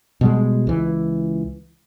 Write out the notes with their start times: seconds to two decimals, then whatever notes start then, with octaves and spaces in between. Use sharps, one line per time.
0.21 B2 G3 G#3
0.67 C#2 E3